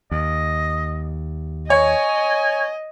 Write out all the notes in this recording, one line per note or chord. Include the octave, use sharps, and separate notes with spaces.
D#2 D#5
C#5 D#5 G#5